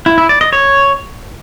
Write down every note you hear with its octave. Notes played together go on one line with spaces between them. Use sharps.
E4
E4
D5
D#5
C#5